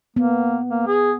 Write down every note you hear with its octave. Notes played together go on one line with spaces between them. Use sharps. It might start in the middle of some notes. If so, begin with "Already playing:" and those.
A#3 B3
A#3
G#4